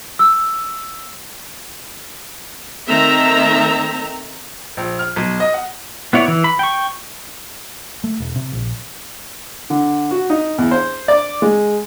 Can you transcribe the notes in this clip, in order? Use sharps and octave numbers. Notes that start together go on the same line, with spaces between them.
E6
D#3 A3 C4 E5 A#5
A#1
F6
B1
D#5
F#5
B3 E4 C#5 D5
E3
B5
G5 C#6
A3
E1
C3
A#1
D3
F#4
D#4
E2
C5
D5
G#3